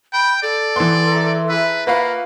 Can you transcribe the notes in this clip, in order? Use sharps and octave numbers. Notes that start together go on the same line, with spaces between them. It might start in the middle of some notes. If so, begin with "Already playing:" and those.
G5 B5
A4 D5
E3 B3 C6
E5 A#5
E4 G#4 B4 A5
A#3 F4 A#4 B4 F5 F#5 C#6